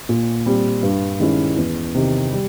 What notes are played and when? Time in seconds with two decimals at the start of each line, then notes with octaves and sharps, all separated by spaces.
0.09 A#2
0.46 G3 C4
0.83 G2
1.20 D#3 G#3 C#4 E4
1.57 E2
1.95 C3 D#3
2.31 G3